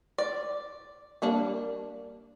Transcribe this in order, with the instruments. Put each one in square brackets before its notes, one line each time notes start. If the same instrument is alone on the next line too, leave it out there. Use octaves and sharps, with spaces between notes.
[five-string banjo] D5
[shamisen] G3 A#3 D4